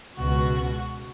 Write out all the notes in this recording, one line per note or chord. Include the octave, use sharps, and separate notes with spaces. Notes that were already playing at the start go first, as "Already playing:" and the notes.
C#2 B2 F#4